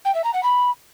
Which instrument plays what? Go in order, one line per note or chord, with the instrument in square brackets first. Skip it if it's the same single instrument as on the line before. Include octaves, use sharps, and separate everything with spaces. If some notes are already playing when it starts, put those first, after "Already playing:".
[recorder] G5
E5
A#5
F#5
B5